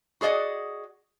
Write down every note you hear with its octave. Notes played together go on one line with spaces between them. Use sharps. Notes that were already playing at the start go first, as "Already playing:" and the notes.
F#4 G#4 D5 D#5 F#5